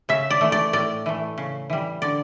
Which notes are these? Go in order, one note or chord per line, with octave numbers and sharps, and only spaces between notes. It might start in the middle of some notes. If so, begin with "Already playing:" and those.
C#3 E5
D5
E3 A3
D5
A2 D5
E3 A3
C#3
E3 G3
D3 D5